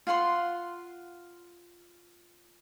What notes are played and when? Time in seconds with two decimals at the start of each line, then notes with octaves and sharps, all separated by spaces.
0.07 F4 F5 F#5 C6